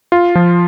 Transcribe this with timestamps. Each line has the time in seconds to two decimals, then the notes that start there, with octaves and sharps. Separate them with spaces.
0.12 F4
0.35 F3